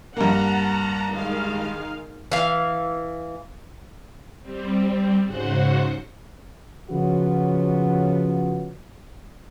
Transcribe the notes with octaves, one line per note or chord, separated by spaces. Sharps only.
G2 A#3 F#5 A5 A#5
D#3 G#3 F5
E3 F5
G3 C4
G#2 C#3 F#4 C5 F#5
C#3 F3 F#3 B3 F4 F#4